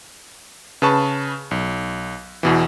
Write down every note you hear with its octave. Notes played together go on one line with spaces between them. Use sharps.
C#3 B4 A5 C#6
B1
E2 B2 E3